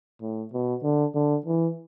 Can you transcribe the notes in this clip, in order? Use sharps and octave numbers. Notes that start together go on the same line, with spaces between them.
A2
B2
D3
D3
E3